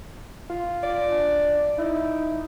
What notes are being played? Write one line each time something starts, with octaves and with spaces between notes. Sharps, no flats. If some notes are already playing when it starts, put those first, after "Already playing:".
F4
D5
D4
D#4 E4